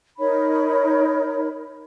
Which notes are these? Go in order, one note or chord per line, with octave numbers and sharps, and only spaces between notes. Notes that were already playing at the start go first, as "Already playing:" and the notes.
D#4 A#4 C#5 B5